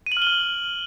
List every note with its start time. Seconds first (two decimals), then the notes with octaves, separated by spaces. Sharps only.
0.06 D#7
0.12 F#7
0.17 F6
0.22 G7
0.27 F6